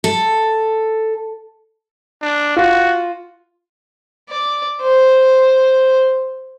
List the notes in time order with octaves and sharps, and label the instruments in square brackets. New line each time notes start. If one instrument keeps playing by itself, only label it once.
[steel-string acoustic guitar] A4
[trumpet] D4
[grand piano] F4 [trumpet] F#4
[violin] D5
C5